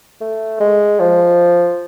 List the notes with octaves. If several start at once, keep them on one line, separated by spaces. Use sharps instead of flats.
A3
G#3
F3